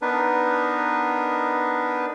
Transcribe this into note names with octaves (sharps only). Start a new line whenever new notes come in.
B3 D4 D#4 A#4 B4